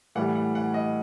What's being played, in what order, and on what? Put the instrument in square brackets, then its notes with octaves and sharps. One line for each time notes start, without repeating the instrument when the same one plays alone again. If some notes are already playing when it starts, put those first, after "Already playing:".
[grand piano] A2 E3 G3 F#5
F#5
F#5
D#5